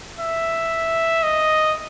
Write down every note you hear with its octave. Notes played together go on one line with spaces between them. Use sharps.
E5
D#5